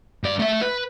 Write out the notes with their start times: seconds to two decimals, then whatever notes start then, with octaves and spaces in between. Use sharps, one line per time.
0.24 G2 D5
0.39 A3 E5
0.62 B4